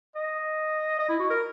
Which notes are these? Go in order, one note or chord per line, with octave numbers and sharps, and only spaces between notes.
D#5
D#5
E4
F#4
A#4